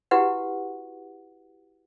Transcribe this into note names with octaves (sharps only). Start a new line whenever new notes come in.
E4 F#4 G4 B4 F#5